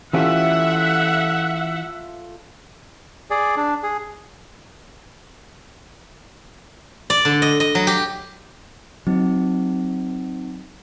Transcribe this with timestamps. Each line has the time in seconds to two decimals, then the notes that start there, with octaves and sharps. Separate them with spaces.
0.13 E3 A3 C#4 F4 G4 E5 F#5
3.30 G#4 D5
3.57 D4
3.83 G#4
7.10 D5
7.25 D3
7.42 D#5
7.60 D#5
7.75 F#3
7.87 G4
9.07 F#3 C4 D#4